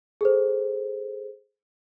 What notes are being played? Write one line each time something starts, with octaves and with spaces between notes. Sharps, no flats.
G#4 A4 C5